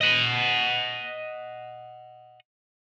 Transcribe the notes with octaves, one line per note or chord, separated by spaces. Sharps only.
D#5 F#5